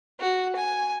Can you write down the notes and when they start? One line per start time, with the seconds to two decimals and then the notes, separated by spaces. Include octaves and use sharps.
0.20 F#4
0.56 G#5